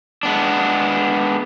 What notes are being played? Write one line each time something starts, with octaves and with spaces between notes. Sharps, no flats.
G#3 B3 D4